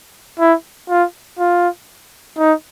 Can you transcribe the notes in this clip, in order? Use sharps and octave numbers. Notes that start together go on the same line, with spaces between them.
E4
F4
F4
D#4